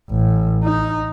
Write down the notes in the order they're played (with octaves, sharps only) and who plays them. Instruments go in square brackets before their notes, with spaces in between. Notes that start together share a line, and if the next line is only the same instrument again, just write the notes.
[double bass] A1
D#4